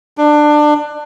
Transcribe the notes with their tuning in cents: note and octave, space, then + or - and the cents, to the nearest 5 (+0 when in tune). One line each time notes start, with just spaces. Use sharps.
D4 +20